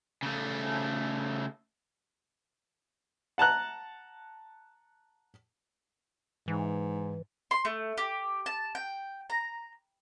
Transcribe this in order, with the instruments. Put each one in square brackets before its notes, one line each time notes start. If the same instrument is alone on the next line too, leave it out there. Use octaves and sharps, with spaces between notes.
[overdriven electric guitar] C#3 A3
[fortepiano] F#5 A5 A#5 F#6
[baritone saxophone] G#2 [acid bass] E3
[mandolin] C6
A3
G4
A5
G5
A#5